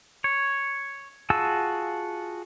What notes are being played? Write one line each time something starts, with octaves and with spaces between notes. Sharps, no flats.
C#5
F4 F#4 G#4 A5 E6